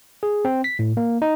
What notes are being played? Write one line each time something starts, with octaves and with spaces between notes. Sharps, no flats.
G#4
C4
B6
A2
A#3
D#4